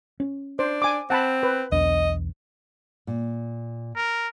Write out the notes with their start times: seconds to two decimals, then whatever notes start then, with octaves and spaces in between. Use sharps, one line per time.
0.20 C#4
0.59 D4 C5
0.82 G#5 D6
1.10 C4 F#5 A5 B5
1.43 B4
1.72 B1 E2 D4 D#5
3.07 A#2
3.96 A#4